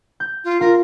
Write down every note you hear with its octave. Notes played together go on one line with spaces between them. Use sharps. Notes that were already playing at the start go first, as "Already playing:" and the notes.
G6
F4
F4 A#4